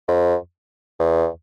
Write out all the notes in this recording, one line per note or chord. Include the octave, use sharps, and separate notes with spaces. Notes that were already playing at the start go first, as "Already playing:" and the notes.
F2
E2